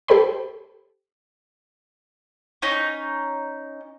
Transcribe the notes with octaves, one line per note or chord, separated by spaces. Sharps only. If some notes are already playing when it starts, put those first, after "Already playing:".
G4 A4 C5 G5 B5
C#4 D#4